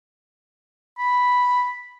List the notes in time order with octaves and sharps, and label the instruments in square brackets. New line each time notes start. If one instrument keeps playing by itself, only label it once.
[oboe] B5